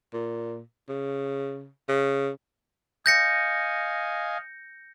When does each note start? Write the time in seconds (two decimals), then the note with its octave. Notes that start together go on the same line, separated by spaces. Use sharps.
0.14 A#2
0.89 C#3
1.88 C#3
3.06 D#5 F5 G#5 G6 A#6 C#7